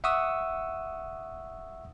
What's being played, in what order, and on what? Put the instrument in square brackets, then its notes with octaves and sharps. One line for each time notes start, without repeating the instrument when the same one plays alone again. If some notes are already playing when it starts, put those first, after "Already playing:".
[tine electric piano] E5 F#5 C#6 D#6 E6